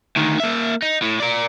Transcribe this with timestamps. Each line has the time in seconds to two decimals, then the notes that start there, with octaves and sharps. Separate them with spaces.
0.16 D2 D#3
0.40 A#3 E5
0.82 D#4
1.02 A2
1.20 A#4 D5